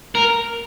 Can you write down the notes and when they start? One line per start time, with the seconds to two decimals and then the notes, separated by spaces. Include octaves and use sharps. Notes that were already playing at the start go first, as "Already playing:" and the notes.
0.15 A#4